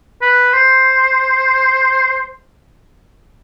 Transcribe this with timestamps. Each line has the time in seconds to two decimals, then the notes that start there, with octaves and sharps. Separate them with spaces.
0.22 B4
0.53 C5